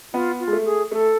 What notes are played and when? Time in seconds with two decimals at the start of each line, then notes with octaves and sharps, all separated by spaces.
0.14 B3 F4
0.40 F4
0.47 G#3
0.53 A3
0.65 G#4
0.91 A3 A4